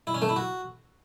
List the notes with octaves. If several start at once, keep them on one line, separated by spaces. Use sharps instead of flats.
E4
C#4
A3
E4
F#4